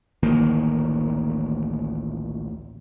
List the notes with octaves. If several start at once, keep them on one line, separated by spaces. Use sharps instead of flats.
A1 D2 D#3 A#3